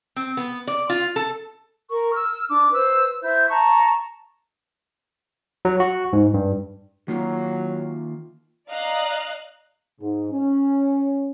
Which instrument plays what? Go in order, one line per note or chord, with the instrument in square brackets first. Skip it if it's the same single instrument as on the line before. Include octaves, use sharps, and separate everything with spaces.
[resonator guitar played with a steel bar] C4
B3
D5
F4
A4
[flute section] A#4 C#6
E6 F6
D4 D6
B4 C5 E6
E4 C5 E5 G6
A5 A#5 C#6
[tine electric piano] F#3
F#4
G#2
G2
[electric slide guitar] D#3 A#3 F4 [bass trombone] F#3
[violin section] D5 D#5 F5 A#5 F#6
[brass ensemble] G#2
C#4